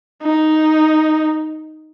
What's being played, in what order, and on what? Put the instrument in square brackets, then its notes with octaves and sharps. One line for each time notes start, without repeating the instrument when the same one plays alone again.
[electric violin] D#4